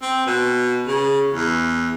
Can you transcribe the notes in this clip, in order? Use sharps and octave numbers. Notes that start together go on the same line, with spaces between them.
C4
B2
C#3
E2